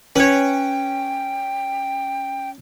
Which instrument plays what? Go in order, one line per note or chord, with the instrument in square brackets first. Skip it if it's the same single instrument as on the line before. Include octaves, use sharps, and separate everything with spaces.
[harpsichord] C#4 [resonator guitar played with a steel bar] B4 C#5 [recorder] G5